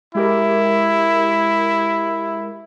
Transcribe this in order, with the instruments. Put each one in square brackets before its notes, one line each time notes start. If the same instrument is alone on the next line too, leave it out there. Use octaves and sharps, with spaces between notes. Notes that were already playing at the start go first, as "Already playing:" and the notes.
[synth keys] G#3 G4 A#4 [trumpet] E4